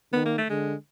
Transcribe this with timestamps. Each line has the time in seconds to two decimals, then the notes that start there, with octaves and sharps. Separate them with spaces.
0.13 D#3 B3
0.25 A#3
0.38 A3
0.50 D3 G#3